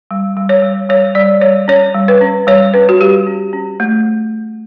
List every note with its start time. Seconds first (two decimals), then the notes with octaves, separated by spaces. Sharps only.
0.11 G3
0.37 G3
0.49 C#5
0.62 G3
0.89 G3 C#5
1.15 G3 D5
1.41 G3 C#5
1.68 C#4 C#5
1.95 G3
2.08 B4
2.21 C#4
2.47 G3 C#5
2.74 C#4 B4
2.89 F#4
3.01 G3 G4
3.27 C#4
3.53 C#4
3.80 A3